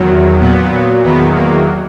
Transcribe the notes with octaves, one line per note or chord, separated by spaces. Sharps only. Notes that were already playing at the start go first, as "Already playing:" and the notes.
Already playing: E2 D#3 F#3
A#2 F#3 B3
E2 D#3 F#3 B3
A#3